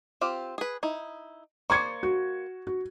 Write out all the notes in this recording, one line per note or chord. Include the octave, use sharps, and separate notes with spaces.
C4 F4 G4
G#4 B4
D#4 E4
A#3 C5 D5 C#6 G#6 C#7
F#4
F#4